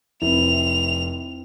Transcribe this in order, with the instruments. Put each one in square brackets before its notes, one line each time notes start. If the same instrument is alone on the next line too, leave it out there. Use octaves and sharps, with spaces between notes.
[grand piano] F1 [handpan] C4 E4 [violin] F7